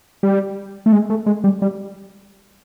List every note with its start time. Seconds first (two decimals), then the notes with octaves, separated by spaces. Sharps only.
0.23 G3
0.86 A3
0.92 G#3
1.10 A3
1.26 G#3
1.44 G3
1.62 G3